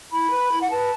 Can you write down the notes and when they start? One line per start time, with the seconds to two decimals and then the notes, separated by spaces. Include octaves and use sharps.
0.12 E4 B5
0.31 B4
0.51 E4
0.61 F#5
0.70 B4 A5